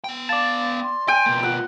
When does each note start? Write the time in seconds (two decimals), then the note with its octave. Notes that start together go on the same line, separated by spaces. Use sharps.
0.04 B3 G5
0.29 D5 F5 A5
0.82 C6
1.08 G5 G#5
1.26 B2 A#3
1.43 F4 F#5